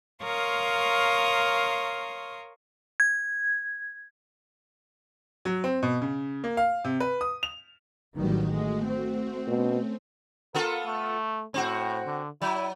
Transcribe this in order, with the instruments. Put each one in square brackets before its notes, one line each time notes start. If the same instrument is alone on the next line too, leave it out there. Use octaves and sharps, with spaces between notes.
[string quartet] A#4 C#5 F5 C6 C#6 D#6
[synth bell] G#6
[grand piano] F#3
C4
B2
C#3
A#3
F5
C3
B4
D#6
F7
[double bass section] A1 D#3 G3 [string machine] F#3 F#4 G4
[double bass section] G#3 [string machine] A3 F#4
[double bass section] C4
[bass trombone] B2 [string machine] A3 C#4
[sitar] B3 F4 A4 [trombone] A#4
[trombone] A3
[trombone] A2 [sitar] C4 F#4
[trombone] D3
[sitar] F#3 [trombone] E4